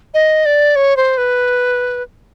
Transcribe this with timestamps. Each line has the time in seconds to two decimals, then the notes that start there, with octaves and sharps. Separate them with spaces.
0.14 D#5
0.46 D5
0.76 C#5
0.97 C5
1.18 B4